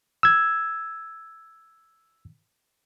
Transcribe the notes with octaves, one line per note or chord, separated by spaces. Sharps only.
E6 G#6